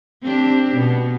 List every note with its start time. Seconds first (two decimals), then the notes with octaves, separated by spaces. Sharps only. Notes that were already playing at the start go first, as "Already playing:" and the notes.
0.22 C4 D4 G4
0.73 B2 B3